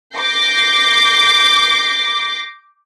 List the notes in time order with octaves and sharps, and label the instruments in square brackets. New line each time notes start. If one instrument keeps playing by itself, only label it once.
[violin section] D6 G6 A#6 C7